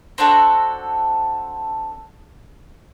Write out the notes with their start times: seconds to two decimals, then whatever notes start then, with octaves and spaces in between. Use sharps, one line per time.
0.18 C4 D4 F#4 A4